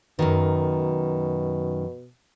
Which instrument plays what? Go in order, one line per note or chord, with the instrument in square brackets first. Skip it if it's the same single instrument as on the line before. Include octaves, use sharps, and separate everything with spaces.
[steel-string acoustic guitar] F#2 D#3 [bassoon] B2